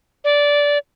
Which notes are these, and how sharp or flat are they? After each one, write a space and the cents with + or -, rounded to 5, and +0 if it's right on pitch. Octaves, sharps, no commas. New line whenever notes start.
D5 -15